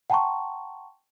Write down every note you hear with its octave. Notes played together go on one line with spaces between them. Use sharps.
F#5 G5 A5 A#5 C6 C#6